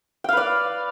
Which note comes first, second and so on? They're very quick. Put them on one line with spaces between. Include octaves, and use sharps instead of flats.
G5 F5 B4 D5